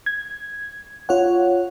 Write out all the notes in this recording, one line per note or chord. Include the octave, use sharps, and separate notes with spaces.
G#6
F4 C#5 F#5